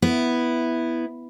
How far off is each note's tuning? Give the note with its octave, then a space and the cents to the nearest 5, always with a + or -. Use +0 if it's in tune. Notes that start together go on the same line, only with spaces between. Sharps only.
B3 +0 E4 +0